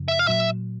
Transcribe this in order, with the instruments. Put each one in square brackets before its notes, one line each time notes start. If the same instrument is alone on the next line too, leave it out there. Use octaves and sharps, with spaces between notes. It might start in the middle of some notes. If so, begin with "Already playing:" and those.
Already playing: [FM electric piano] F#2 C#3 F3
[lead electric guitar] E5
F5
[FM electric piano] A#2 F#3 [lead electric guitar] E5